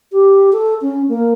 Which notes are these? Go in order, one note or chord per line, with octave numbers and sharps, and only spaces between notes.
G4
A4
C#4
A#3